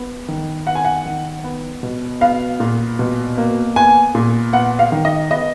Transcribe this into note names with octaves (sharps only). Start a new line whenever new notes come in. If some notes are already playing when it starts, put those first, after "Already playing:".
Already playing: B3
D#3
B3 F#5
G#5
F#5
D#3
B3
B2
B3 F5
A#2
B2
A#3
B3 G#5
A#2
B3 F#5
F5
D#3
D#5
B3 D#5